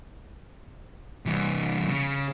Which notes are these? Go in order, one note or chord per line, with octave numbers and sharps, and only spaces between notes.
C2 E3
C#3